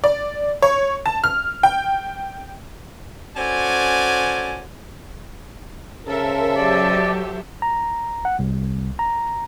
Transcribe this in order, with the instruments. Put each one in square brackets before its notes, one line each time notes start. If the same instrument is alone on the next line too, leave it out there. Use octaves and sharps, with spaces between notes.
[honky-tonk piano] D5
C#5
A5
F6
G5
[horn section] C#4 F#4 A4 C5 D5 G#5
[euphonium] C#3 [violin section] A4 C5 E5 [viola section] A#4
[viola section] F#3 G4 [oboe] D5
[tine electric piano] A#5
F#5
C2
A#5